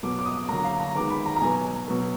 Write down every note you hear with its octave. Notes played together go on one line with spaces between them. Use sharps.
B2 F#3 B3 D6
D6
D#6
D3 F#3 A#3 A#5
F5
A#5
D#3 G#3 B3 D6
B5
A#5
A#5
B2 F#3 B3 G#5
B2 F#3 B3